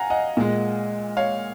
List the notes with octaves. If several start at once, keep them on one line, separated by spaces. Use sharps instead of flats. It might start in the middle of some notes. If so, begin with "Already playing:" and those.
Already playing: F5 F#5 G#5 A#5
D#5 F#5
A#2 G#3
C#5 F5